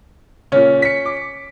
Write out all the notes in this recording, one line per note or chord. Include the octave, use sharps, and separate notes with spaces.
A#2 C#3 C#4
B6 C#7
D6